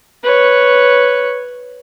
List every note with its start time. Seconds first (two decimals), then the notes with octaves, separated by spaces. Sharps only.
0.24 B4 C#5